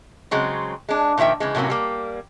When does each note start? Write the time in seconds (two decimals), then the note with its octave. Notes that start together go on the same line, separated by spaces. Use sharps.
0.31 C#3 F#3 G#3 C4
0.89 G#3 D4
1.18 A#2 D#3 F3 E5 G5
1.40 C#3 E3 G#3
1.55 A2 C3 F#3 A#3 C#4
1.70 G3 A#3